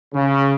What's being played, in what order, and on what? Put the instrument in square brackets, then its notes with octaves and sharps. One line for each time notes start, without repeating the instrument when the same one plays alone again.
[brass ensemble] C#3